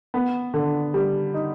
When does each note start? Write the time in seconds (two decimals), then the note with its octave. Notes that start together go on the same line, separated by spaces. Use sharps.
0.14 B3
0.54 D3
0.94 G3
1.34 D#4